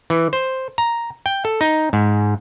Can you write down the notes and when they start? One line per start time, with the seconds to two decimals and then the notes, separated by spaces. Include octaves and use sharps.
0.10 E3
0.33 C5
0.78 A#5
1.26 G5
1.45 A4
1.61 D#4
1.93 G#2